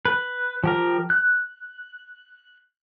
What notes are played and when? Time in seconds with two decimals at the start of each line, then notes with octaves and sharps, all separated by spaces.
0.05 B4
0.64 F3 G4 A#4
1.10 F#6